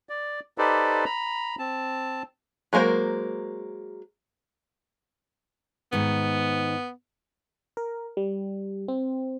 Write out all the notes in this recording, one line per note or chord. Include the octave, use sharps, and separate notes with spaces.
D5
D#4 G4 A4 B4 C5 D5
A#5 B5
C4 A5
F#3 G#3 A#3 A#4 C5
G#2 D#3 B3
A#4
G3
C4